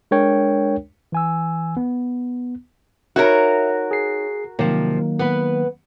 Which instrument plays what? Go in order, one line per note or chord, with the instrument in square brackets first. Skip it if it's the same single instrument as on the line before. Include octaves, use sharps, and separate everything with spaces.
[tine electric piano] G#3 D4 A#4 C#5 G5
E3 G#5 E6
B3
[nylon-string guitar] D#4 C#5 [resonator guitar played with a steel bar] F#4 A#4 [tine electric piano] E5
[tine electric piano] G#4 C7
[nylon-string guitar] C3 F3 [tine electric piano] D#3 F#3 A#3
[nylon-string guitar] B3 B4